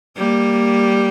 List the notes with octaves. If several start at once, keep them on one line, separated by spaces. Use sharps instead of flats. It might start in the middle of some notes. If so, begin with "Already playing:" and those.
G3 A#3